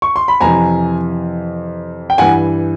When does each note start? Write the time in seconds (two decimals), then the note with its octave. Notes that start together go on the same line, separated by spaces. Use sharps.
0.02 C#6
0.16 C6
0.28 B5
0.41 F2 C3 E3 G#5 A#5
2.10 G5
2.18 G2 E3 F#5 G#5